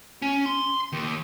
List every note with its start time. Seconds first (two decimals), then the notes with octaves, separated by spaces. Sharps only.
0.22 C#4
0.46 C6
0.92 D#2